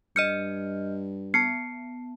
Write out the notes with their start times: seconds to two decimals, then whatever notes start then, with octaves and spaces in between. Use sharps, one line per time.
0.16 G2 D#5 F6 G6 C#7 D#7
1.34 B3 A5 C7 C#7